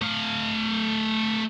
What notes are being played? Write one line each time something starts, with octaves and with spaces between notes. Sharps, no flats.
A3 F5